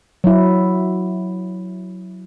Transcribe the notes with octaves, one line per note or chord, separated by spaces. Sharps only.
F#3 E4